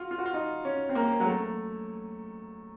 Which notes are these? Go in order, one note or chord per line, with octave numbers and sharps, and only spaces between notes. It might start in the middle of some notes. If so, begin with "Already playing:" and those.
Already playing: F4 F#4
F4
F#4
F4
D#4
C#4
C4
A#3
F#3
A3